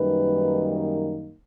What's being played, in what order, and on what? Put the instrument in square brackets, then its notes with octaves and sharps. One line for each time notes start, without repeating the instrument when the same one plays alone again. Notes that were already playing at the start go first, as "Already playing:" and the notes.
Already playing: [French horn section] F#2 D#3 G3 A#3 D#4 B4